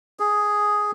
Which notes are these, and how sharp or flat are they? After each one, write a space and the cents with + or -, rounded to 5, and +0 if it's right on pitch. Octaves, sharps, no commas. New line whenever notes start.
G#4 +0